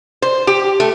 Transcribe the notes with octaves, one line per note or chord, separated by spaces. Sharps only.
C5
G4
A3